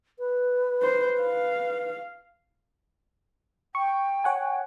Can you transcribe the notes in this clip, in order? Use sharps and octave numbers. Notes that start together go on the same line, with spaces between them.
B4
C5
F5
G5 C#6
C#5 F#5 G#5